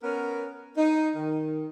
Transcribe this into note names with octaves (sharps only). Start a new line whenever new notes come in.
B3 C#4 A#4
D#4
D#3